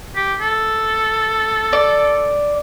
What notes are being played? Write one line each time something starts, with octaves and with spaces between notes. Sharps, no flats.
G4
A4
D5